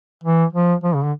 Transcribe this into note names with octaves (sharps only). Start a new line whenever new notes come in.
E3
F3
F3
C#3
D3